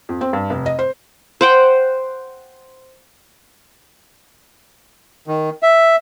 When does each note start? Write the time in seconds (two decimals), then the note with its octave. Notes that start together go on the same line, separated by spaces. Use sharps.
0.09 F2
0.21 C4
0.33 G2
0.50 F1
0.66 D#5
0.79 C5
1.41 C5 F#5 G5
5.27 D#3
5.63 E5